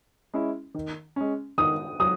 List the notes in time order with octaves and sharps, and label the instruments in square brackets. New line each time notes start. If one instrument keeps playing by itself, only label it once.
[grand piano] G#3 C#4 E4
D#3
G#3 C#4
[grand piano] D#3 [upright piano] D#6
[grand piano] F#3 [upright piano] D#6